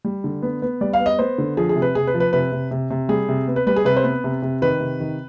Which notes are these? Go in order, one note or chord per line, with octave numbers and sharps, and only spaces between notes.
G3
D3
B3
B3
G3 D5
F5
B3
D#5
B3 C5
D3
F3 G#4
G#4
C3
B4
C3 G#4
B4
F3
B4
C3 B4
C3
C3
C3
G3 G#4
C3
B3
B4
G3 B4
G#4
C3 B4
C5
B3 B4
C3
C3
D#3 B4
C3
D#3